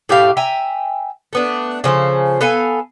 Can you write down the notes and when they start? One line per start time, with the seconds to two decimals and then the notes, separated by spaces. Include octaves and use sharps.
0.09 A2 G4 E5 F5
0.37 E5 G5 G#5 A#5
1.33 A3 B3 D4
1.84 C#3 F3 A4 C5
2.41 B3 A4 F5 G#5